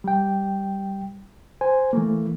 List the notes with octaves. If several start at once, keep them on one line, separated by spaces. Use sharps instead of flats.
G3 G5
C5 G#5
E3 A3 A#3